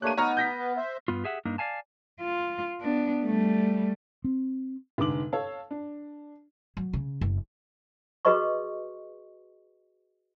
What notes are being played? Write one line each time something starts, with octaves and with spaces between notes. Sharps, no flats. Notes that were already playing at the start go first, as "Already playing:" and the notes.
A3 A#3 D4 G4 C#5 F#6 D#7
B3 D#4 C#5 A#5 F6
G6 A#6 B6
B4
C5 E5
G2 B3 F4
G4 G#4 E5 F#5
G2 A#3 D4 D#4
D5 E5 F5 G#5 A5
F4
B3 D4
G3 A3
C4
F1 G#2 D3 D6 F#7
A4 C#5 F5
D4
F#3
C#3
F#1
F#4 G#4 B4 D#5 C6 C#6